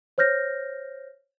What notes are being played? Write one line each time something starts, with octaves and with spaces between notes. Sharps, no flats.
C5 C#5 F6 G6 A#6